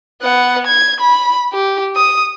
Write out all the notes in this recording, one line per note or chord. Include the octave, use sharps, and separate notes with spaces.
B3 F#5
G#6
B5
G4
D#6